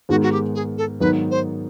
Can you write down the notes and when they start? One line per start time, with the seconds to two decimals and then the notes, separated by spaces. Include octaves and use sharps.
0.09 G#2 D#3 G#3 B3 F#4
0.23 F#4
0.32 G4
0.55 G#4
0.78 A4
1.00 G#2 D#3 F#3 B3 D#4 B4
1.31 C5